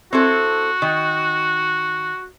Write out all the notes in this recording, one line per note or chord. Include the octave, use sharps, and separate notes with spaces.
C4 E4 F#4 A4
D#3